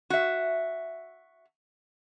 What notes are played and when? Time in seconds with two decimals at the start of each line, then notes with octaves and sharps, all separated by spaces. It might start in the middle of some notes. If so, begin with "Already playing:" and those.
0.10 F#4 E5